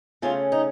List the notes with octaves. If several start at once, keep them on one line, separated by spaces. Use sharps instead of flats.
C#3 A3 C#4 F4
D#4